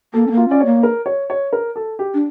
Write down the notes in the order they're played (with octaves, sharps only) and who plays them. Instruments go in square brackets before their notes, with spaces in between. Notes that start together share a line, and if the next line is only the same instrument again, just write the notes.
[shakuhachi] A#3 [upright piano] A4
[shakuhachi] C#4
A#3
[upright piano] F4
[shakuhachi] C#4 [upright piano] D5
[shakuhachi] A#3 [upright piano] C#5
[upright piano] A#4
C#5
C#5
A#4
A4
G4
[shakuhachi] D4